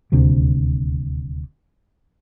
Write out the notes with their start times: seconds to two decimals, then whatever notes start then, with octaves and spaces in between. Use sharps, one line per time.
0.12 D#1 D2 C3